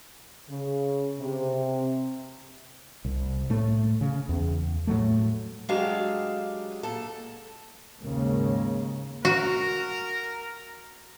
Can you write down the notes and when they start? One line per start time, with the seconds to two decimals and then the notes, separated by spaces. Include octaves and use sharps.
0.49 C#3
1.20 C3
3.05 C2
3.50 A2 A3
4.01 C#3
4.29 E2
4.87 A2 F#3 A3
5.69 F#3 G#3 D4 G4 A4 F5
6.83 A#2 A4
8.02 D#2 G#2 C#3 G#3 A#3
9.25 F#4 A#4